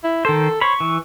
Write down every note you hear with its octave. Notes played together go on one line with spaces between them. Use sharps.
E4
D#3 A4 C5
C5 C#5 B5 C#6
E3